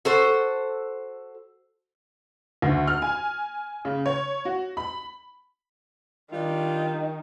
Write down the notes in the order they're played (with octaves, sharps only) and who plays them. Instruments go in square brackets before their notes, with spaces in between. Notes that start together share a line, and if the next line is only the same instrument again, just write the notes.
[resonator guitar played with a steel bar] F#4 A4 C5
[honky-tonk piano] D2
F6
G#5
C#3
C#5
F#4
B5
[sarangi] D#3 [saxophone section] G3 D4 F4